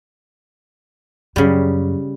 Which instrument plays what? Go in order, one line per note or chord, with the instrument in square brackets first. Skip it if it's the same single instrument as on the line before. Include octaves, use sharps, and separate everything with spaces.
[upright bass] F#2 [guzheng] C#3 G3